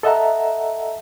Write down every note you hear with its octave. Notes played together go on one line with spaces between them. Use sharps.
A4 D#5 E5 F#5 A5 A#5